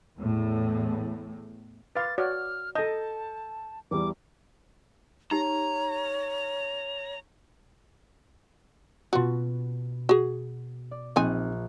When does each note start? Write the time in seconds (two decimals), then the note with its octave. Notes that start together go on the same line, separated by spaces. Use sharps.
0.18 E2 A2
1.96 B4 F5 D6 A6
2.18 F#4 C#5 D5 F6
2.75 A4 D#5 A5 G6
3.91 E2 G3 D6
5.31 D#4 G4 C#5 A#5
9.13 B2 B3 F4 F#4 B4
10.09 F#4 G#4
10.91 D5
11.16 A#1 A#3 C4 D#4 G#5 F#6